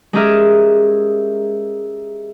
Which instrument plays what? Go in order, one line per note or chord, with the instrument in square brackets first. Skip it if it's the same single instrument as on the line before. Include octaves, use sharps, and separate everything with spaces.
[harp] G#3 C#4 G4 G#4 A#4 E5